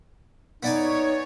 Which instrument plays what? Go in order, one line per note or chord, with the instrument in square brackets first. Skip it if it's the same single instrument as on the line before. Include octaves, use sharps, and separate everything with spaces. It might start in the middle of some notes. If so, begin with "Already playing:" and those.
[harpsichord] B3 D5 G#5 [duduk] D#4 [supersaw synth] C#5